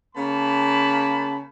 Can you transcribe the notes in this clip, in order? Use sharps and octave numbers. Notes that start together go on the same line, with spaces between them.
C#3 A#3 A5 B5